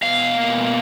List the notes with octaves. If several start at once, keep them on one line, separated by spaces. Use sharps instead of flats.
B2 F5
A#3